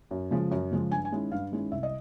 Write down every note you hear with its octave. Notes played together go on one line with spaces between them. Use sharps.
F#2
C#3 F3 G#3
F#2
C#3 F3 G#3
G2 G#5
G#5
D#3 G#3 C#4 E4
G2 F5
D#3 G#3 C#4 E4
C2 E5
D#5